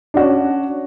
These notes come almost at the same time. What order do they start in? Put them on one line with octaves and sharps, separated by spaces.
D4 F#4 C#4